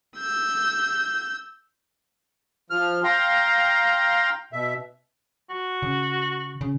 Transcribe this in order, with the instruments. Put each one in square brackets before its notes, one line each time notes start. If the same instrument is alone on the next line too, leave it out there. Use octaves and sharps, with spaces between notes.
[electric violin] E6 G6
[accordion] F3 F6
F5 G5 A#5 C6
B2 E5
[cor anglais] F#4
[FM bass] C#3
C#3